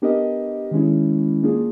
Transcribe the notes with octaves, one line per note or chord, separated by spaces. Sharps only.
B3 D4 G4 A#4 D#5
D#3 G#3 C#4 E4
A#3 D4 F4 G#4